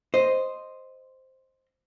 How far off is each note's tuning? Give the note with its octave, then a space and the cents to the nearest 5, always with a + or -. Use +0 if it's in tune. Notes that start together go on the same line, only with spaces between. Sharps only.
C5 +0 D#5 +0